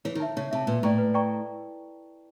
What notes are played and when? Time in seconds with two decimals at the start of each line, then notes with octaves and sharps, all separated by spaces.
0.05 E3 C#5
0.15 D#3
0.20 E5 A5
0.37 C#3 C#5
0.51 C3 E5 A5
0.67 A#2 B4
0.83 A2 D5 G5 A#5 C#6
0.98 B4
1.14 D5 G5 A#5 C#6